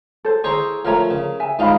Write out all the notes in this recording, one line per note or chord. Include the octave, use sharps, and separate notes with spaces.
A4 C5
E4 G#4 C5 C#5 A#5
F3 A3 A#4 C#5 A#5
C#3
E5 G#5
G#2 D#4 F4 F5 A#5 B5